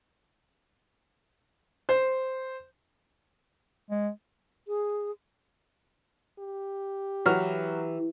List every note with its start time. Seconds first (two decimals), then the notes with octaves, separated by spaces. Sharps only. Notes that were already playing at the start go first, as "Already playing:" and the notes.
1.89 C5
3.90 G#3
4.68 G#4
6.39 G4
7.26 E3 F#3 F6